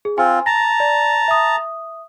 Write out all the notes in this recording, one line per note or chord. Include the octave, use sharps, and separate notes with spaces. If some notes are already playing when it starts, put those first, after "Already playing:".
G#4
C4 F4 G#5
A5 A#5 A#6
D5
E5 D#6